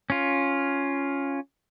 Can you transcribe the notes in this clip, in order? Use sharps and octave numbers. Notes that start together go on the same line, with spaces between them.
C#4 F4